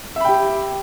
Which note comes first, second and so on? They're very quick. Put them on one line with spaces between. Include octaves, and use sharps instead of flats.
E5 B5 G5 G4